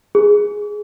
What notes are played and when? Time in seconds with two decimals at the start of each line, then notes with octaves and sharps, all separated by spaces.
0.15 G#4